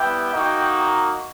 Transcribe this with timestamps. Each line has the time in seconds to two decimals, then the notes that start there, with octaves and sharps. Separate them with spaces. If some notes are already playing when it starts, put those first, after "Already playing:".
Already playing: G3 B3 E4 G4 G5
0.33 A#3 D#4 F#4